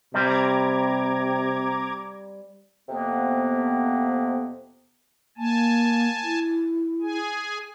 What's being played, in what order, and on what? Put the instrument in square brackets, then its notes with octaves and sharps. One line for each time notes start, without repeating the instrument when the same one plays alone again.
[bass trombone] C3 [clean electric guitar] G3 C4 [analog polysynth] A#5 D6 G#6
[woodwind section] F2 C3 A#3 B3
[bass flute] A#3 [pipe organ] G#5 A5
[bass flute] E4
[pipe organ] G#4 G#5